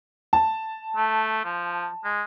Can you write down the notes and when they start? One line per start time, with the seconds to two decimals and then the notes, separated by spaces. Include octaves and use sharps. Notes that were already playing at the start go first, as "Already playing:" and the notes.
0.33 A5
0.96 A3
1.44 F3
2.04 G#3